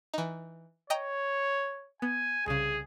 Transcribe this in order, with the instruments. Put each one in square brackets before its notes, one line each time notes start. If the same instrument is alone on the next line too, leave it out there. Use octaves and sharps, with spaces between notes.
[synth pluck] E3 D#4
[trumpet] C#5 [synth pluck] D#5 G5 A#5
[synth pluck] B3 [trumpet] G#5
[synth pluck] C2 C#3 [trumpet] G#4